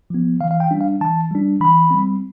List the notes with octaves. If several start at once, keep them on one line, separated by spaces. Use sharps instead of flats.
F3 B3
E3 F5
F5
G5
G3 D4
F5
E3 A5
G3 D4
E3 B5
G3 C4